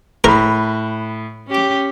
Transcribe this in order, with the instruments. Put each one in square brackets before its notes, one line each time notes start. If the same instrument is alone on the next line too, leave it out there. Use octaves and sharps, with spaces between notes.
[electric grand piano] A2 B5 [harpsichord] A#4
[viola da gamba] C#4 G4